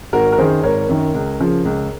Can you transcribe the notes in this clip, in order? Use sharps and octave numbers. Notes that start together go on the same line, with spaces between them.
G#1 F#4 A#4
A#4
F#2 D#3 G#4 C5
G#1 A#4 C#5
F#2 D#3
C#2
C#3 F3
C#2